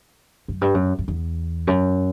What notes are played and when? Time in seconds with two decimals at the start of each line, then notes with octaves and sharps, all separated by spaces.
0.48 F#2
0.61 G2
0.74 F#2
0.99 F#2
1.08 E2
1.67 F#2